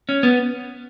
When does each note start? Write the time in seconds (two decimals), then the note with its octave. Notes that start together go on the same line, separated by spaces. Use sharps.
0.09 C#4
0.23 B3